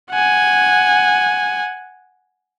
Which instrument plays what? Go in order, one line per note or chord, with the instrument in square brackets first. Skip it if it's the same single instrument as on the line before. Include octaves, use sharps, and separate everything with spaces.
[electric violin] F#5 G#5